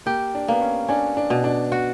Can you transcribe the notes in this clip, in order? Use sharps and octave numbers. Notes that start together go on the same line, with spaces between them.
A#3 G4
D4
A#3 B3
C#4
C#4 D4
D4
B2
D4
F#4